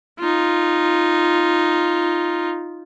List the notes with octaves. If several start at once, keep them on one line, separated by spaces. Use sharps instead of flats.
D#4 F4